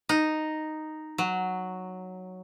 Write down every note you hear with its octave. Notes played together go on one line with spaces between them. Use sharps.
D#4
F#3